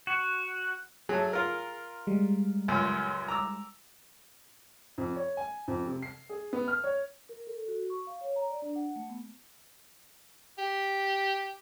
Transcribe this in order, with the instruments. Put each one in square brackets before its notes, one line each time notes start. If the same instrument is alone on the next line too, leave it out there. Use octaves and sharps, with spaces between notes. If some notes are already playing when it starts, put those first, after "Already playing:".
[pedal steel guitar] F#4
[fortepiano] F#3 A3 [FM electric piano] G#4
[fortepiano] F4 A#4
[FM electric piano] G3 G#3
[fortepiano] C#2 F#2 A#2
A#5 D6 E6
[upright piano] F2
C#5
G#5
F2
C3
C7
G#4
B3
F6
C#5
[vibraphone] A#4
A4
F#4
C#6
F5
C#5
A#5
D5
D4
F#5
A3
B3
[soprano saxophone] G4